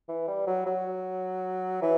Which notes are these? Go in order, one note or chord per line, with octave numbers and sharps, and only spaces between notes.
E3
G3
F#3
F#3
E3